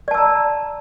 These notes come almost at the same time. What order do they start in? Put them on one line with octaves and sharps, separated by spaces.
D5 A5 E6 A#5